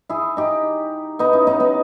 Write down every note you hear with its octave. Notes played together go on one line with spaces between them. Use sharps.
E4 G#4
D#4 G4
B3 D#4
C#4 E4
B3 D#4
B3 D#4